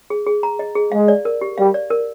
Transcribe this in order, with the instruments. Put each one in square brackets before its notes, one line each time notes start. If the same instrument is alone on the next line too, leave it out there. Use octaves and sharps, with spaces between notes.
[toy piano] G#4
G#4
A#5
D#5
G#4
[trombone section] G#3 [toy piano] F5
[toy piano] D5
A#4
G4
[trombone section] G3 [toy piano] F5
[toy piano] D5
A#4